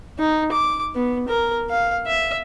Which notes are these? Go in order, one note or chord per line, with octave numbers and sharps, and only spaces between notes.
D#4
D6
B3
A#4
F5
E5